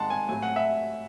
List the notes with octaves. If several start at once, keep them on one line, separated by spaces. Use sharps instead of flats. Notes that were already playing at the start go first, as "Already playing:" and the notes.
Already playing: D#3 G#3 F#5 A5 C6
G#5
A2 F#3 A3 G#5
F#5
E5